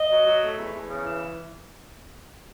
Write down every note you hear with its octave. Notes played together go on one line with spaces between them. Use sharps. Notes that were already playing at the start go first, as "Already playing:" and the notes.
Already playing: D#5
F#3
F#3
A3
E2
E2
C#3
E3